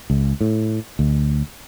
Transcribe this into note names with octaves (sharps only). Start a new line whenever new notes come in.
C#2
A2
D2